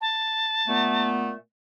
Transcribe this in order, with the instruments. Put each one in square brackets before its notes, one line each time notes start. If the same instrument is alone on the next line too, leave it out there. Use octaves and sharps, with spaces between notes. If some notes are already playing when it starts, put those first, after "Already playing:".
[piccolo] A5
[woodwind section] A#2 A3 B3